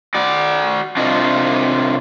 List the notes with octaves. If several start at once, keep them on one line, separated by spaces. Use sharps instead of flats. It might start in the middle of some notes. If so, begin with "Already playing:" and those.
F#4 D5
C3 D4 F4 D#5